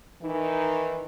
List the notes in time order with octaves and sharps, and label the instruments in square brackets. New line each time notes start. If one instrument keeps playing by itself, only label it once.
[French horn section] D#3 E3 D#4